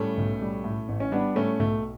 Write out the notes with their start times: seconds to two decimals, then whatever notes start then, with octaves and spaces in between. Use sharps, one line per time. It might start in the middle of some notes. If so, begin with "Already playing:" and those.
Already playing: A2 G3 A3 C#4
0.17 B1
0.41 G3
0.64 A2
0.89 A1
1.00 C#4
1.12 G3 B3 D4
1.35 A2 A3 C#4
1.59 B1 A3